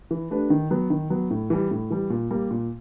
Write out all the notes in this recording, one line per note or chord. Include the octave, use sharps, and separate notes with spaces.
E3
A3 D4 G4 B4
D#3
F#3 B3
D#3
F#3 B3
A2
E3 G3
A2
E3 G3
A#2
G3 A#3
A#2